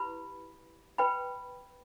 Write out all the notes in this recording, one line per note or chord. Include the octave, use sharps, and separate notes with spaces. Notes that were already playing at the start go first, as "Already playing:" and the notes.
Already playing: E4 G4 B4 B5
B4 G5 B5